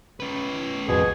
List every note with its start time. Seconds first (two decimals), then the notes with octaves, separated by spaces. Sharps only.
0.20 C#4 B4
0.88 A1 F2 B2 G#4